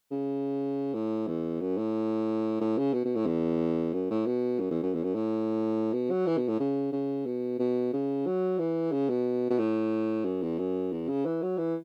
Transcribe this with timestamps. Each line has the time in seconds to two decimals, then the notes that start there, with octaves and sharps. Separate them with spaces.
0.11 C#3
0.94 A2
1.27 E2
1.61 F#2
1.77 A2
2.60 A2
2.78 C#3
2.93 B2
3.05 B2
3.15 A2
3.26 E2
3.93 F#2
4.11 A2
4.26 B2
4.60 F#2
4.71 E2
4.83 F#2
4.94 E2
5.04 F#2
5.15 A2
5.93 B2
6.10 F#3
6.26 E3
6.37 B2
6.48 A2
6.60 C#3
6.92 C#3
7.26 B2
7.59 B2
7.93 C#3
8.26 F#3
8.58 E3
8.92 C#3
9.09 B2
9.50 B2
9.58 A2
10.25 F#2
10.42 E2
10.58 F#2
10.91 E2
11.08 C#3
11.25 E3
11.42 F#3
11.58 E3